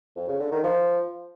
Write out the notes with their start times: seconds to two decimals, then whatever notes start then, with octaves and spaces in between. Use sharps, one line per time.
0.16 F2
0.28 C#3
0.40 D3
0.52 D#3
0.63 F3